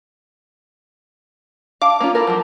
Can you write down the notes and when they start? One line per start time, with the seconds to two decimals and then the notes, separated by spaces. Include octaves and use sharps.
1.82 F5 A5 D6
2.00 A#3 C#4 F4
2.15 E4 A4 A#4
2.27 F3 F#3